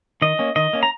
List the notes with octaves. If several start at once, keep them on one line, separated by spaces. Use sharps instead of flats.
D#3 D#5
A#3 C#4
D#3 D#5
A#3 C#4
A#5